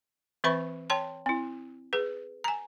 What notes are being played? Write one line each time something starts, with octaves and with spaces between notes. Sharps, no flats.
E3 C4 B4 E5 B5 C#6
C#5 G5 A5 C6
C4 E4
G#4 B4
G#5 A#5